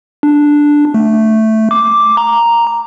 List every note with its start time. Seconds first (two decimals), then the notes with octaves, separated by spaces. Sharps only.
0.23 D4
0.94 A3
1.71 D6
2.17 A#5